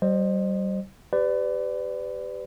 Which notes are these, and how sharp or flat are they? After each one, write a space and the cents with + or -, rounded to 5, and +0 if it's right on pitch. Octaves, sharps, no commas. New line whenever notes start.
G3 -30 C5 +10 D#5 -30
G4 +0 B4 +35 D5 +0